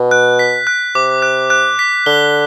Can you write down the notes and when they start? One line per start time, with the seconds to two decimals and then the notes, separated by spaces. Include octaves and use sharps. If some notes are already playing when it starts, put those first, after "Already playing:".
Already playing: B2
0.11 F#6
0.39 B6
0.67 F#6
0.95 C3 D6
1.22 F#6
1.50 F#6
1.79 B6
2.06 D3 G7